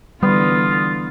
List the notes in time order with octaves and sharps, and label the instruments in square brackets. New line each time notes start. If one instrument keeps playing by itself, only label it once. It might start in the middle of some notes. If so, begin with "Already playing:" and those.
[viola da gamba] D3 E3 [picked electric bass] G3 [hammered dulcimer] B3 [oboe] F4